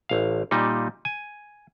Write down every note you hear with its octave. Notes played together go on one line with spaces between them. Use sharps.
A1 F5
A#2 G3 D#4
G#5